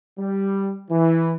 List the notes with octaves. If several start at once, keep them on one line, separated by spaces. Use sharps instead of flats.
G3
E3